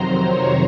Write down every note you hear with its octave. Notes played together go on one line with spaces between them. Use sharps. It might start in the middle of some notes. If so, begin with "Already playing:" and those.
Already playing: F2 C3 D#3 F#3 C5 A#5 C6
C#5